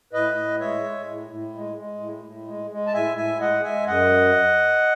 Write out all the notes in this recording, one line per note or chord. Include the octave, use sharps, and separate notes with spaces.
A2 B4 D#5
A2
G#3 C#5 E5
G#3
A2
A2
G#3
G#3
A2
A2
G#3
G#3
A5
A2 E5 G#5
A2 E5 G#5
G#3 D#5 F#5
G#3 E5 G#5
F#2 D#5 F#5